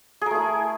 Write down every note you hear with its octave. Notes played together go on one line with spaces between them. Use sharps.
A3 E4 G#4 A#4